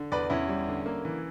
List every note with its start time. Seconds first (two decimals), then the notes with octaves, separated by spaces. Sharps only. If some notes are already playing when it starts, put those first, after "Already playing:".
Already playing: D3
0.12 E2 B4 D5
0.30 E2 C#4 E4
0.48 G3
0.68 D3
0.86 A#3
1.05 E3